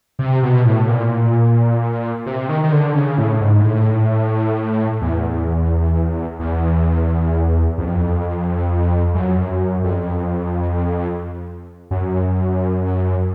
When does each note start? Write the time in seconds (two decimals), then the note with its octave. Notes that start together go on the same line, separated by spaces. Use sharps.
0.19 C3
0.43 B2
0.65 A2
0.88 A#2
2.26 C3
2.49 D#3
2.63 D#3
2.72 D3
2.95 C#3
3.18 A2
3.41 G#2
3.64 A2
5.02 E2
6.40 E2
7.78 F2
9.14 F#2
9.84 F2
11.91 F#2